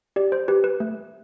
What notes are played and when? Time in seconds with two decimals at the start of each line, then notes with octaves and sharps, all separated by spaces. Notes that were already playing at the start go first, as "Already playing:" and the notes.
0.16 G4 D5
0.32 C5
0.48 G4 B4
0.64 B4
0.80 A3